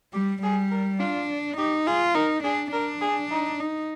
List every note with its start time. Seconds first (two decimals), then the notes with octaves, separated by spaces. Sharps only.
0.13 G3 G4
0.42 G3 G#4
0.71 A#4
1.00 D4 F4
1.57 D#4 G4
1.87 F4 G#4
2.15 D#4 A#4
2.43 D4 G#4
2.72 D4 A#4
3.01 G#4
3.31 D#4
3.60 D#4